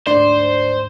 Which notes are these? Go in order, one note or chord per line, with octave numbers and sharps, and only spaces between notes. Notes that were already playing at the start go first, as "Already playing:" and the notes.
D2 G#2 D4 C5